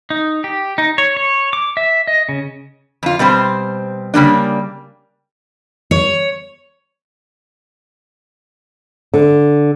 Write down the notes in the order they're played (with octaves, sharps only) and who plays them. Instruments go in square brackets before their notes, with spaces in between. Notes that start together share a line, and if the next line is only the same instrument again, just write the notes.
[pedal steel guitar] D#4
G4
D#4
C#5
C#5
D6
E5
D#5
C#3
[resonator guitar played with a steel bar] F2 F4
B2 G3 C4 C5
C#3 G3 A#3 D4
[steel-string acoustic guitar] C#5
[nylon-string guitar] D3